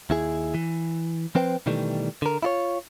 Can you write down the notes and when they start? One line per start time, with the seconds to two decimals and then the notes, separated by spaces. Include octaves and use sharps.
0.10 D#2 E4 G#4
0.54 E3
1.35 F3 C4 B4 C5 G5
1.66 B2 D#3 E3 G3 A3
2.22 D3 A#4
2.43 E4 F4 C#5